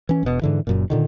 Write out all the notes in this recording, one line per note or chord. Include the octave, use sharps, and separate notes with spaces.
E3 C#4
E1 B2
G#2 D3 E3
F#1 F#2 A#2
A#2 D3 D#3